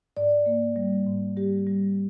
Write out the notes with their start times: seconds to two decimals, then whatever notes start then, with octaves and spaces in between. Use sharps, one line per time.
0.17 G#2 D5
0.46 A#3
0.76 G3
1.06 G#2
1.37 G3 G4
1.67 G3